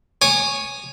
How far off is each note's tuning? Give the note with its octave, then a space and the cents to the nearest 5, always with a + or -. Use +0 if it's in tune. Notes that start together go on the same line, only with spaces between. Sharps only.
C#5 +0 G#5 +0 D#6 -40